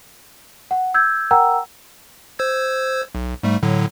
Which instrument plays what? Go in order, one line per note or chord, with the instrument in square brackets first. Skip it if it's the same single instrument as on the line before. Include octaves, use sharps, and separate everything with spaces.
[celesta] F#5
E6 G6 G#6
A#4 F#5 G5 A#5 E6
[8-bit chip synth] C5 E6 G#6
B1
G#2 G3 A3
A2 D3 F#3